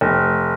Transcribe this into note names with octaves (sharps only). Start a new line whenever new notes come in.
F1